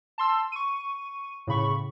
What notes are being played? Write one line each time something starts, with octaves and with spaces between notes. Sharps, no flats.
A5 C6 E6
C#6 D#7
A2 C#3 B5 C#6